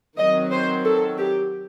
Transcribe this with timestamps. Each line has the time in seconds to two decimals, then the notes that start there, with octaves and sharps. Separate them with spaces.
0.18 D#3 F#3 C4 D#5
0.51 C5
0.85 A4
1.18 G4